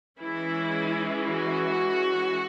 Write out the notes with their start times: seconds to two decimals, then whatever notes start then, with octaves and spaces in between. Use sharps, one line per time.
0.20 E3 G#3 C#4 E4
1.27 F#4